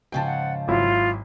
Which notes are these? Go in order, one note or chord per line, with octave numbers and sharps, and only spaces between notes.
G#2 C#3 F3 G5 A5
F#5
G#1 F#3 E4 F4